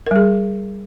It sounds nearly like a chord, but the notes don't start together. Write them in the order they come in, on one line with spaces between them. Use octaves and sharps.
A#4 G3 G#4